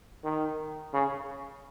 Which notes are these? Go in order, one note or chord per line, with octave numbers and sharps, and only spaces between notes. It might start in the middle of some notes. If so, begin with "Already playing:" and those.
D#3
C#3